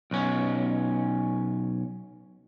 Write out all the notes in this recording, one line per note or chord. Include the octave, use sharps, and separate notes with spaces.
B1 C#4